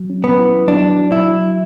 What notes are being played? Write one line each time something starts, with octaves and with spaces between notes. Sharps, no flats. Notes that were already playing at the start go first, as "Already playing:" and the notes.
Already playing: F#3
C#4
B3
E4
F#3 D4
F#3
E4
F#3